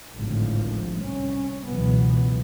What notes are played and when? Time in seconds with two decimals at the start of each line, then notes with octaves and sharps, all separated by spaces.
0.17 G#1 C#2 A2 D3 F3
0.96 C2 C#4
1.68 C#2 B2 E3 F#3 B3